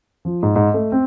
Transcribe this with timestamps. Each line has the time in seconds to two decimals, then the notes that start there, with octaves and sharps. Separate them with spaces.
0.25 F3
0.43 G#2
0.56 G#2
0.74 A3
0.92 C4